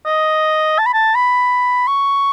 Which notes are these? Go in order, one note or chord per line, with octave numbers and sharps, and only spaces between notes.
D#5
A5
B5
A5
B5
C#6